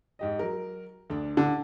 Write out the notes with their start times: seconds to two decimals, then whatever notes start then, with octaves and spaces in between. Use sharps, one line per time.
0.19 G#2 G4 D#5
0.39 F#3 A#4
1.10 D2 D4
1.37 D3